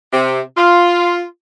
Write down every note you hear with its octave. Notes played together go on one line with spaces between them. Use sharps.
C3
F4